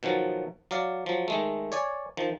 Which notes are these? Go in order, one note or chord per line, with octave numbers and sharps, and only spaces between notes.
B2 D#3 F3 F#3
F#3 D5 F5
F3 F#3
D#3 G#3 A3
C#5 D5 G#5
D#3 F3